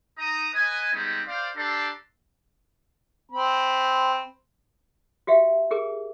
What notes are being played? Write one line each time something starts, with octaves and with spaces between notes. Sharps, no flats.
D#4 A#5 D#6
B4 D#5 G#5
G3 G#3 B3 C4 D#4
C5 D5 F5
D4 G4 A4 D5 A#5 C6
C4 B5
F#4 G4 E5 F5
G4 G#4 A#4 D6